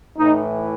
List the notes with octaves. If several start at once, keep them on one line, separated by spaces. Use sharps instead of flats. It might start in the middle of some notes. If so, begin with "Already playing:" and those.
A2 E3 D#4